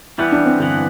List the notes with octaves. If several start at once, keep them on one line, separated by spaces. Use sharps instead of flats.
E3 G3 B3 E4
D4
C4
G2 D3 E3 B3